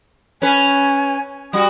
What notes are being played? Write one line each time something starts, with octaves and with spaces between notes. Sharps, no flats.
C#4 B4 G#5
G3 F#4 D#6